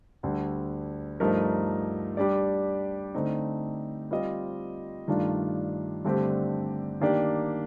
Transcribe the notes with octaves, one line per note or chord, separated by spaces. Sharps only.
D2 D3 G3
G2 F3 A3 D#4 A#4
G3 D4 G4 D5
D3 A3 C4 D#4
G3 C4 F4 C5 D#5
G2 D#3 A3 D4 F4
G2 D3 A3 C4 G4
D#3 A#3 D4 G4 D5